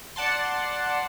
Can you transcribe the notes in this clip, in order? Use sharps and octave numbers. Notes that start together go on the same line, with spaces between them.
D5 F#5 A5 C6